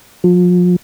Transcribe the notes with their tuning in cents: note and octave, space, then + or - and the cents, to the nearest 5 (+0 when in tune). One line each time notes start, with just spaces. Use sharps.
F3 +35